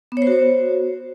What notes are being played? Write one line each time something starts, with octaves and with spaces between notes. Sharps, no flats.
B3
C#5
C5
F#4
C5